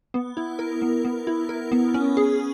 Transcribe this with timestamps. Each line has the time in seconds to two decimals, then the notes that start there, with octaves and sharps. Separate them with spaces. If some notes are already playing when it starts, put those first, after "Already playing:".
0.14 B3
0.37 E4
0.59 A#4
0.82 B3
1.05 B3
1.27 E4
1.49 A#4
1.72 B3
1.94 C#4
2.17 G#4